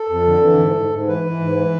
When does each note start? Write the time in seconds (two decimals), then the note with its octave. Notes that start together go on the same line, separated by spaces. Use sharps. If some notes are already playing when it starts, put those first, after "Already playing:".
Already playing: A4
0.09 F2
0.26 D3
0.42 E3
0.59 G#2
0.76 G#2
0.91 G#2
1.08 E3 B4
1.24 E3
1.40 G#2
1.57 E3